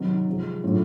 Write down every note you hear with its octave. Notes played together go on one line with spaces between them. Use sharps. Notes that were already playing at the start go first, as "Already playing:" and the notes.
Already playing: C3 D#3 F#3
C3 F3 G#3
A2 F#3 A3 D4 F4